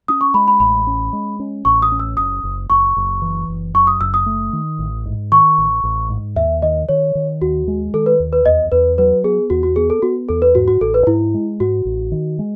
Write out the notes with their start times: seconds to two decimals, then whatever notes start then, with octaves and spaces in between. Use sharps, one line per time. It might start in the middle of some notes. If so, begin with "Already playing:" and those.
0.08 C#4 D#6
0.21 C#6
0.34 G#3 B5
0.48 B5
0.60 A1 B5
0.87 C#4
1.13 G#3
1.40 C#4
1.65 A1 C#6
1.82 D#6
1.92 C#4
1.99 E6
2.17 F#1 D#6
2.43 F#1
2.70 F#1 C#6
2.96 F#1
3.22 E3
3.48 F#1
3.74 F#2 C#6
3.87 D#6
4.00 F#1 E6
4.14 D#6
4.26 A3
4.53 D#3
4.79 A1
5.06 G#2
5.32 D#3 C#6
5.58 A1
5.83 A1
6.09 G#2
6.36 D#2 E5
6.62 D#3 D#5
6.89 D#3 C#5
7.15 D#3
7.42 D#2 F#4
7.68 G#3
7.94 D#3 A4
8.06 B4
8.20 D#2
8.33 B4
8.46 E2 D#5
8.72 E2 B4
8.98 F#3 B4
9.24 B3 G#4
9.50 E2 F#4
9.63 F#4
9.76 B3 G#4
9.90 A4
10.02 B3 F#4
10.29 E2 A4
10.42 B4
10.55 G#2 F#4
10.68 F#4
10.81 A1 A4
10.94 B4
11.07 G#2 E4
11.34 G#3
11.60 G#2 F#4
11.85 A1
12.12 D#3
12.39 G#3